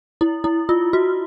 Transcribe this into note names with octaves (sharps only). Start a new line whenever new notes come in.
E4
E4
F4
F#4